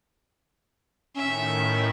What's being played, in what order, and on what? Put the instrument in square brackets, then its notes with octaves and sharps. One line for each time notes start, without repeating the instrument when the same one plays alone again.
[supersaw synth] A2 D#3 [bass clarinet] C#4 [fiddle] E5